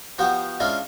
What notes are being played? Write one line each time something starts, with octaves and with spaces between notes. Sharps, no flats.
F3 B3 F#4 G4
G#3 C#4 D4 E4 F4 D#5